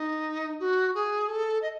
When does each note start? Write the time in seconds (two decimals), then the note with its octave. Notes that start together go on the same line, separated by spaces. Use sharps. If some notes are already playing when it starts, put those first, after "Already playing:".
Already playing: D#4
0.60 F#4
0.94 G#4
1.28 A4
1.62 D#5